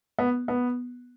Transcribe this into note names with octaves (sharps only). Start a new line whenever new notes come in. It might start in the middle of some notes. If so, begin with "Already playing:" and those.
B3
B3